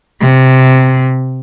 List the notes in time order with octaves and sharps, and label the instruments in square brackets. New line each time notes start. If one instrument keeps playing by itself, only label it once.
[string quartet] C3